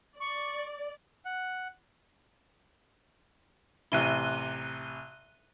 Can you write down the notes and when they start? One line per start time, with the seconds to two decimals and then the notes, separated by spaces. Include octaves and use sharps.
0.20 D5 C#6
1.25 F#5
3.92 A1 C3 E4 F#6 D#7 G7